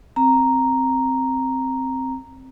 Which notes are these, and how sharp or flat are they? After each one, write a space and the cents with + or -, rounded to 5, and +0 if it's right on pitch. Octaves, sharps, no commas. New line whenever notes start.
C4 +0 A#5 +0